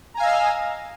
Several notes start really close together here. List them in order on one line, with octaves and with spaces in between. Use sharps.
A#5 G#5 F5 E6 D#5